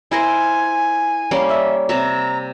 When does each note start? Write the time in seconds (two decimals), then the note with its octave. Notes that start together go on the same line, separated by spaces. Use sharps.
0.11 E4 A#4 C5 G#5
1.31 G3 A#3 C#4
1.49 E5
1.89 C3 E5 A#5